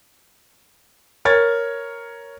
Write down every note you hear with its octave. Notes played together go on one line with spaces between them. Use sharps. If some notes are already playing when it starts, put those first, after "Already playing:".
A#4 C#5 G#6 A6